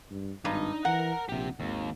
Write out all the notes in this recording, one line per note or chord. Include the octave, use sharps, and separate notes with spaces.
G2
G#1 G2 D#4
E3 A#4 F#5 A#5
A#1 C3 G4
G#1 D#2